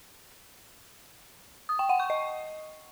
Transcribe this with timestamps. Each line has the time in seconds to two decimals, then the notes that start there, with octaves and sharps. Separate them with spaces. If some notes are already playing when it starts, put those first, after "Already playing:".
1.69 D#6
1.79 G5
1.89 F#5
2.00 C#6
2.10 D#5